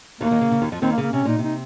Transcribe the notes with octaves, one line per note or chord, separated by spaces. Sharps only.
D#2 D#3 A#3
D#2 D#3
C#3
C#3
D#2 D#3
F2 F3
D#2 D#3 C4
A#3
C#3
A#3
C3 C#4
A#2 D#4
C3 D#4